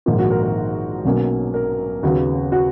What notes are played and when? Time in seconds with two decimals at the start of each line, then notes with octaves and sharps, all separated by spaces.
0.06 A#1 G#2 D#3 A#3 F4
0.19 F#4
0.31 A#4
0.43 A#4
1.04 B1 B2 F#3 A#3 C#4
1.54 A#4
2.03 D#2 C#3 F#3 B3 F#4
2.52 F#4